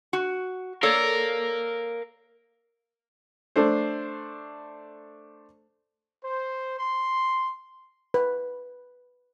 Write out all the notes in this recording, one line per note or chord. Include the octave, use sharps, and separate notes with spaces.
F#4
A4 A#4 C#5 D5 F5
A3 D4 A4 C5
C5
C6
B4